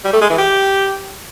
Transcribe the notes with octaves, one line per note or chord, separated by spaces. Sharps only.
G3
A3
G#3
E3
G4